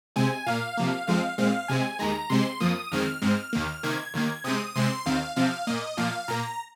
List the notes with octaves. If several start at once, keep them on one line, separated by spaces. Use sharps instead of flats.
C3 G#3 C4 G#5
A#2 A#3 F5
C3 F3 A#3
F2 F3 G#3 C4 F5
A#2 G#3 C4 F5
C3 G#3 C4 G#5
D#2 D#3 G#3 A#5
C3 G#3 C4 C6
F2 F3 A#3 D#6
F2 D#3 G#3 C4 F6
G#2 G#3 C4
D#2 D#3 A#3
C3 D#3 A#3 G#6
D#2 D#3 A#3
C3 G#3 C4 D#6
C3 G#3 C4 C6
D#2 D#3 C4 F5
C3 F3 C4 F5
A#2 A#3 D#5
A#2 F3 A#3 F5
A#2 A#3 A#5